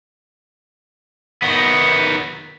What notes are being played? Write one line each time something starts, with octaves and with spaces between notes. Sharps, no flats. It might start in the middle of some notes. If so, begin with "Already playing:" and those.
D#3 B3